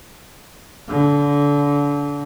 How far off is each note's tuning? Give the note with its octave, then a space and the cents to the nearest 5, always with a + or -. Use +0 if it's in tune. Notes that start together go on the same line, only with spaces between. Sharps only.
D3 -30